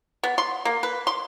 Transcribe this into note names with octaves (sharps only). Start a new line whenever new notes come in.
B3
C6
A#3
B4
C6